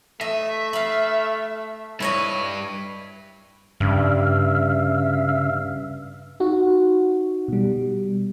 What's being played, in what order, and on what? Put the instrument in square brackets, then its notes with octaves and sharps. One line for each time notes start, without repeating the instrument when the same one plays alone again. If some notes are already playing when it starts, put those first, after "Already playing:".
[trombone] A3 [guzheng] D#5 [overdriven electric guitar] E5
[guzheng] F5 B5
[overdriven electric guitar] G2 B4 [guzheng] E4 C#5 D#5
[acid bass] G2 [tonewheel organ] C#3 E5 F5
[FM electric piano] D#4 F#4
B2 G3